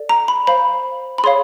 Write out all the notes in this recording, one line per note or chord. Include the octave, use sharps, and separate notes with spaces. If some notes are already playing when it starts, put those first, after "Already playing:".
Already playing: A4 D5
A#5
B5
C5 F5 B5
B5
G#4 C#5 F5 C6